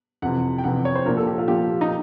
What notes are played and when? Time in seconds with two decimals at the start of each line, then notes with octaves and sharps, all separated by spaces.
0.22 F2 C3 E3 F#5
0.58 G5
0.64 F2 C3 E3 F#5
0.85 C#5
0.95 C5
1.06 A#2 F3 A#4
1.17 A4
1.27 G4
1.38 F4
1.48 A#2 F3 G4
1.81 D#4